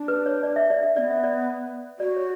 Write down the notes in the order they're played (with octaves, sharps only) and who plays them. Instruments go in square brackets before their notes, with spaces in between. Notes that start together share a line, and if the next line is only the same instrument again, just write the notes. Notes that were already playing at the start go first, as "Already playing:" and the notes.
Already playing: [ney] D4
[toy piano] B4
C#5
D5
E5
D5
E5
[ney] B3 D4 [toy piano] D5
[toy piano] E5
D5
[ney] F#4 [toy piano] D5
[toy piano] C#5